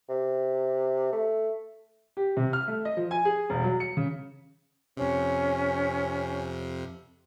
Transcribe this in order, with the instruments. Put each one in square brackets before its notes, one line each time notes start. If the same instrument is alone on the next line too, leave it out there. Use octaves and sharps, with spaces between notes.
[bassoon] C3
A3
[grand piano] G4
C3
F6
A3
D#5
F3
G#5
G#4
E1
F#3
C#7
C#3
[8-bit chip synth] F2 C3 [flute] C#4